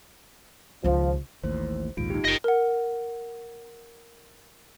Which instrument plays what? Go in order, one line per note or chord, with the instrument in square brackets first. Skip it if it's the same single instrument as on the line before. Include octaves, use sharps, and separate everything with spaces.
[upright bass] C#2 D#3 [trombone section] F3
[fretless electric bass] A1 D#2 A2 [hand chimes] C5
[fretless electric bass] A#1 D#2 G#2 [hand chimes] F4 D7
[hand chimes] D#4 G4
[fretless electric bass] F#1 [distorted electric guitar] D#5 G5
[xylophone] A#4 F#5